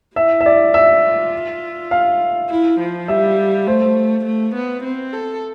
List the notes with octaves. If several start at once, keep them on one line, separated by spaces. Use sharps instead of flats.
E4 E5
E5
D5
F4 E5
F5
E4
F3
G3 E5
A3 C5
A3
B3
C4
A4